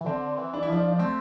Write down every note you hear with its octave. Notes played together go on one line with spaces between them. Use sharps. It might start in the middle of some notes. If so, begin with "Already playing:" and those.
E3
D3 C4
E3
D4
E4
F3 D4
D4
A3 C4